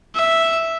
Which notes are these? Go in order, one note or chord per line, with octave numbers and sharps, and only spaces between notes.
E5